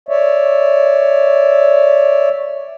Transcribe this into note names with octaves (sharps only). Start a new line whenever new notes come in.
C#5 D5 E5